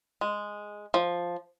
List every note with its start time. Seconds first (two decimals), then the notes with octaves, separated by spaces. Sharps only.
0.21 G#3
0.94 F3